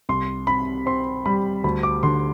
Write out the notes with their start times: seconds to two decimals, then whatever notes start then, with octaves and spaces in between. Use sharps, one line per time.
0.09 C2 C6
0.47 C3 B5
0.86 C4 C6
1.26 G3 B5
1.64 D2 B5
1.83 D6
2.03 D3 C6